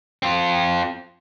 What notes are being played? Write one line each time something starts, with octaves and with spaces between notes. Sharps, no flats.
C4 F4